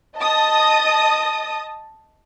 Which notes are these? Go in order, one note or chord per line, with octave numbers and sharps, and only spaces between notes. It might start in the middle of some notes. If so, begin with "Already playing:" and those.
D#5 A5 D#6